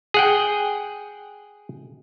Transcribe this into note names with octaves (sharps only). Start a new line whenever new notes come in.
G#4 F#5 G5